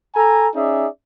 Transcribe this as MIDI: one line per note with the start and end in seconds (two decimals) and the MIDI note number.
0.15 0.48 69
0.15 0.48 80
0.15 0.48 82
0.55 0.87 61
0.55 0.87 63
0.55 0.87 68
0.55 0.87 74
0.55 0.87 76